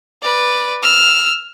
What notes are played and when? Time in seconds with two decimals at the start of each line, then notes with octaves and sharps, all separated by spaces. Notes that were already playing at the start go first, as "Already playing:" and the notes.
0.22 B4 D5
0.83 E6 F6